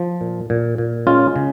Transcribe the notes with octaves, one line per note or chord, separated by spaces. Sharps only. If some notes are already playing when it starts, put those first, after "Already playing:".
Already playing: F3
A#2
A#2
A#2
G#3 C#4 F4
C#3